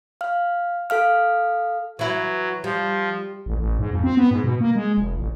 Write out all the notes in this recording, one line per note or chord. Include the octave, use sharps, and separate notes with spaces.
F5 F6
A4 F5 F6
E3 F#3 E4
F3 G3
A1
A1
G#2
F2
C4
B3
G#2
B2
A#3
G#3
F1
A1